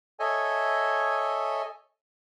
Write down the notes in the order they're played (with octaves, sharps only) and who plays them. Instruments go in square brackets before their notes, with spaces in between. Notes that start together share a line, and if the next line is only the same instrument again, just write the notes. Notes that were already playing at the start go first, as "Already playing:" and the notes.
[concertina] A4 C#5 D#5 E5 G#5